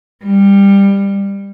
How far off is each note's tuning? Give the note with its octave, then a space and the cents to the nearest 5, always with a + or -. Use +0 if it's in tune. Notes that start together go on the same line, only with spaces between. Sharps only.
G3 +20